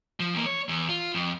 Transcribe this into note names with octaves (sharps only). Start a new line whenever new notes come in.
F3
E2 A#3
C#5
E2
F4
F2